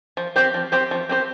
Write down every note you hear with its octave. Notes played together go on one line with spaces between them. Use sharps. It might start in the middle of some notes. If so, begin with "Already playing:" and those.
F3
C4 G4 C5
F3
C4 G4 C5
F3
C4 G4 C5